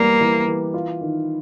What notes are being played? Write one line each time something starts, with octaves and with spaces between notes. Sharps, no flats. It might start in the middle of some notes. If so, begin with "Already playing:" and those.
Already playing: E3 G3 A#3 B3
E3
E3
F4
D#3